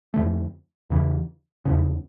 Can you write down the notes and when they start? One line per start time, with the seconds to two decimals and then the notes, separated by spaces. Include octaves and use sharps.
0.14 F2 D3 A3
0.90 E2 C#3 E3
1.65 F1 E2 C#3